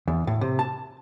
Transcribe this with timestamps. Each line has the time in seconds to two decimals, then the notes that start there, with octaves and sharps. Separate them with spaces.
0.08 E2
0.27 A2
0.41 C3
0.59 A5